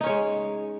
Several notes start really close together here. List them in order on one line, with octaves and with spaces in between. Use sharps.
D#4 C#4 C#5 G#3